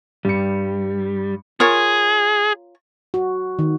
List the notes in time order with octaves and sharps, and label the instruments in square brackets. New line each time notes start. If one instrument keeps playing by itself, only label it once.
[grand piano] G2 C#7 [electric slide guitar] G3
[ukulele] F4 A#4 C#5 [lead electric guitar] G#4
[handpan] F#4
D#3